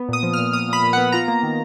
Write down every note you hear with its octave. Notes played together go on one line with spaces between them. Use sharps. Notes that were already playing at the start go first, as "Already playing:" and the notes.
Already playing: B3
A#2 D#6
F3
F6
A#2
A#2 D#6
A#2 B5
A#2
F#5
B3
F4 A#5
A#3
D#3